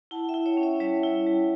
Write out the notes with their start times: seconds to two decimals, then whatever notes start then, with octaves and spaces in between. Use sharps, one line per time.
0.11 E4 F#5 A5
0.28 E5 G5
0.34 E4
0.46 C#5 E5
0.57 C#4
0.63 C#5 E5
0.80 G3 C#5 E5
1.03 E4
1.27 G3